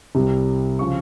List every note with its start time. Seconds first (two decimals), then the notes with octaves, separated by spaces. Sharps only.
0.15 C2 C3 G3
0.79 C#3 F3 C#6